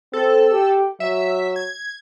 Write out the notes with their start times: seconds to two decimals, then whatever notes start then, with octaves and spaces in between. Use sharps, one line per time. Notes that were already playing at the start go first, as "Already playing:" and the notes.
0.13 C4 A4
0.52 G4
1.00 F#3 E5
1.56 G#6